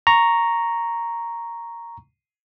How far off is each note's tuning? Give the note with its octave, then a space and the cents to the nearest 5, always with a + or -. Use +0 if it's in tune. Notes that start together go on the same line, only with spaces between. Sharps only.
A#5 +0 C#6 +0